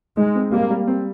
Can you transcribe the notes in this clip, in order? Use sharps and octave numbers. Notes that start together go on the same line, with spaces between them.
G#3 D#4
C4
G3 A#3
G3
C4